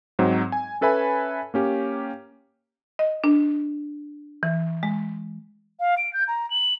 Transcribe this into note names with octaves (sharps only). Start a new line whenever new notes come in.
G#2 F#3 C4
G#5
C#4 A4 B4 E5 G#5 B5
A#3 C#4 G4
D#5
D4
E3
G#3
F5
D7
G6
A#5
F#7